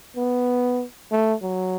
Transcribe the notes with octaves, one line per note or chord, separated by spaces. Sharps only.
B3
A3
F#3